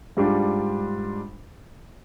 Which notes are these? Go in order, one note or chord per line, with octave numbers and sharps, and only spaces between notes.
G#2 G3 D4 F4